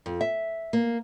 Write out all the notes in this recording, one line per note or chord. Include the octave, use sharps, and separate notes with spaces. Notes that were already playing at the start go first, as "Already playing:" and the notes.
F2
E5
A#3